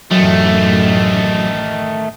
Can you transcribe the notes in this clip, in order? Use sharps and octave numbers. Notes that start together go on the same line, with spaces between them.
A1 F#2 D#3 F#3 A3